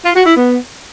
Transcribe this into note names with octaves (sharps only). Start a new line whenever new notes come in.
F4
F#4
E4
B3